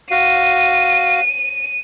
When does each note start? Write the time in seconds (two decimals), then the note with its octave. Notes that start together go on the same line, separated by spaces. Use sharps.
0.11 F#4 F5 D#7